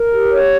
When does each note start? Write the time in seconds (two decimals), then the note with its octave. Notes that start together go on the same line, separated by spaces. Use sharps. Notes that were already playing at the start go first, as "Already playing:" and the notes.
Already playing: A#4
0.11 G4
0.30 C#5